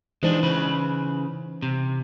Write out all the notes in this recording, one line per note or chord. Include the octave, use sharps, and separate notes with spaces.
E3 G#3 D4 D#4 C5
C#3 B4
C3